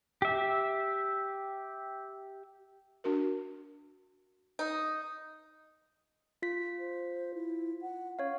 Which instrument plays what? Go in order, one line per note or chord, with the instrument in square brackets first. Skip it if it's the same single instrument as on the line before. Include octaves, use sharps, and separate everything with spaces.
[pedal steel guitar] G4 E5
[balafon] D4 F#4 A#4
[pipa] D#4
[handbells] F4 B6
[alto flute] C5
E4
F#5
[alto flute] C#4 [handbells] C#5 F5